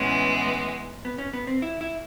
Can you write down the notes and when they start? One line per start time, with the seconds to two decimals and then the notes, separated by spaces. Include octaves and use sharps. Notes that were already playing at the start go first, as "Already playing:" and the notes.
Already playing: A2 E3 G#3 B3 C#4
1.05 B3
1.18 C#4
1.33 B3
1.47 C4
1.62 E4
1.81 E4